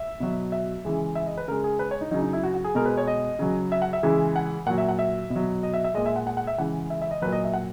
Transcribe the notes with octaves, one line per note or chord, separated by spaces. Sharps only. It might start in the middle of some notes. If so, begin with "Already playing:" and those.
Already playing: E5
B2 F#3
E5
C#3 E3 G#3
E5
D#5
B4
C#3 G#3 A#4
G#4
B4
C#5
D#4
C#3 F#3 D#4
D#4
E4
F#4
F#4
G#4
B2 G#3 A#4
B4
C#5
D#5
C#3 F#3
E5
F#5
E5
C#3 E3 G#3
F#5
A#2 F#3 F#5
E5
F#5
E5
B2
F#3
D#5
E5
E5
A#2 G#3 D#5
E5
F#5
F#5
F#5
E5
C#3 E3 G#3 F#5
E5
E5
D#5
A#2 F#3 B4
D#5
E5
F#5